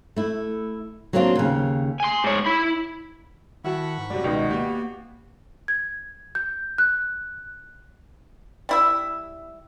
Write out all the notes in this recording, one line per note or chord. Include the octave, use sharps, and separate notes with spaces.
A3 E4
F#3 A#3 C4 D4 F4
D#2 C#3
G#5 C6
G#2 C#5
E4 B5
D#3 E4 F#4 F#5 A5 B5 C#6
G#2
F#2 C3 F#3 G3 D5
C#2 B2 D#3 B3 F#4 D#5
A#3 G4
G#6
G6
F#6
G3 E4 E5